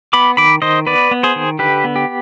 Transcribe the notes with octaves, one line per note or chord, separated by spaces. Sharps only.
B3 B5 D6
D#3 B5 D6
D#3 C5 D#5
B3 B4 D5
B3
G#4 C5
D#3
D3 G4 B4
B3
G4